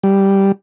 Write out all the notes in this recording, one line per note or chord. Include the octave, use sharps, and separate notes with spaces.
G3